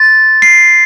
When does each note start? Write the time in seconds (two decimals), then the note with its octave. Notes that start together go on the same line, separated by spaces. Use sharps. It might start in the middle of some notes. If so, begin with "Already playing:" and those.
Already playing: C6 A6
0.42 C7